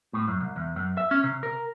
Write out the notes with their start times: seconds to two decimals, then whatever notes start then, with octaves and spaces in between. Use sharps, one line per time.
0.13 A2
0.28 F#2
0.41 C2
0.56 E2
0.76 F#2
0.97 E5
1.11 C#4
1.24 C3
1.43 A#4